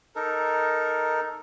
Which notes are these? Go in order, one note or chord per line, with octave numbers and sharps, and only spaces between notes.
D#4 A4 A#4